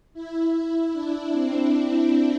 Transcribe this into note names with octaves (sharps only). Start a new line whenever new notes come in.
E4
D4
C4